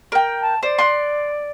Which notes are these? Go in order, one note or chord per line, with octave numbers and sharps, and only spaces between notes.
A#4 G5
A5
C5 D5
C6 F#6